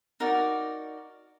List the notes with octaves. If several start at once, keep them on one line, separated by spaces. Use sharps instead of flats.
D#4 F#4 A#4 D5